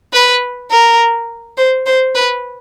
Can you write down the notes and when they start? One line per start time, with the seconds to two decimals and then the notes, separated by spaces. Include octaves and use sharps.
0.13 B4
0.71 A#4
1.57 C5
1.86 C5
2.15 B4